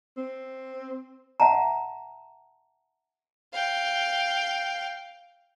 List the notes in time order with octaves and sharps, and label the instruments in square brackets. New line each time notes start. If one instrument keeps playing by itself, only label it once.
[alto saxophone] C4
[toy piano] E5 F#5 A5 A#5
[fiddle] F5 G5